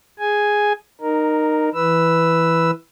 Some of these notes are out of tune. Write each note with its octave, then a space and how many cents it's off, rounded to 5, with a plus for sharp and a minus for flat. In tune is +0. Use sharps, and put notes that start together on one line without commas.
G#4 +0 G#5 +0
D#4 -20 A#4 +0
E3 +0 B4 +0 E6 +0